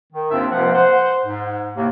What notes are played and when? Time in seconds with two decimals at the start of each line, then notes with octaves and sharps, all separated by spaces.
0.13 D#3
0.31 D#2 G#2 C4 D4 F4 E5
0.51 C#2 C3 F3 A#3 C5 F#5
0.73 C5 F#5
1.25 G#2
1.76 D#2 A2 C3 A#3